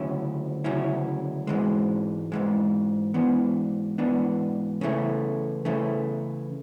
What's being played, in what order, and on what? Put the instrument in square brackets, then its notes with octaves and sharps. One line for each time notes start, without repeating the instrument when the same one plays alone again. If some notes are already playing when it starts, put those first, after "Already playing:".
Already playing: [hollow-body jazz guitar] D2 C#3 F#3 C#4 E4
D2 C#3 F#3 C#4 E4
G#2 E3 G#3
G#2 E3 G#3
G#2 E3 B3 D4
G#2 E3 B3 D4
C#3 E3 A3
C#3 E3 A3